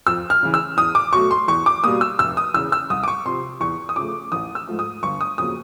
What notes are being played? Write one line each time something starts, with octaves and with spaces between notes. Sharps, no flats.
F2 E6
F6
C#3 E3
E6
E2 D#6
D6
B2 F#3 A3 C#6
C6
E2 C#6
D6
B2 G3 A#3 D#6
E6
F1 E6
D#6
E2 C#3 E6
E6
C2 D#6
D6
C#6
C3 F3 C6
E2 C#6
D#6
C#3 F3 A3 D6
A1 D#6
E6
G#2 F3 A3
D#6
G1 C#6
D#6
F2 C#3 F#3 A#3 D#6